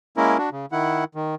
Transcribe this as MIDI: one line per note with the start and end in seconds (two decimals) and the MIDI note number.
0.17 0.37 56
0.17 0.37 58
0.17 0.37 61
0.17 0.37 64
0.17 0.37 70
0.38 0.50 62
0.38 0.50 66
0.52 0.66 49
0.72 1.04 51
0.72 1.04 64
0.72 1.04 78
1.15 1.35 51